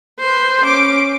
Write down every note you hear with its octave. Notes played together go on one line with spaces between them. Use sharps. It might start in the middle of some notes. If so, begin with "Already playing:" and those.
B4 C5
C#4 D6